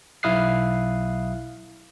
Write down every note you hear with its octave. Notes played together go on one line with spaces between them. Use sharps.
B1 E4 F5 D#6 F#6 C7